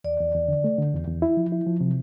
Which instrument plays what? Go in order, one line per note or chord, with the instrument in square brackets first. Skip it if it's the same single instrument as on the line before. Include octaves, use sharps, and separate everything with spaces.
[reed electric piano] E2 [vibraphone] D5
[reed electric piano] E2
E2
D3
A3
D3
E2
E2
E4
F3
E4
F3
C3